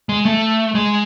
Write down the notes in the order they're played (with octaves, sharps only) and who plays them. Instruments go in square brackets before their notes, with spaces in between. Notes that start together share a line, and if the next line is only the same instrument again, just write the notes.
[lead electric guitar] G#3
A3
G#3